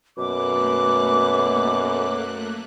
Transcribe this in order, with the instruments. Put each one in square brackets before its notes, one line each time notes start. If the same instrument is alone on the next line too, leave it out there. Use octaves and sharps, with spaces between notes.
[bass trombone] F#2 [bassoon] B2 [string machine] A3 A#3 F#6 [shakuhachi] D6